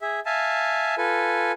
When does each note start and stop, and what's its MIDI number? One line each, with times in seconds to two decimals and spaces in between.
0.02 0.20 68
0.02 0.20 76
0.26 0.95 76
0.26 0.95 77
0.26 0.95 80
0.26 0.95 81
0.98 1.52 65
0.98 1.52 69
0.98 1.52 71
0.98 1.52 80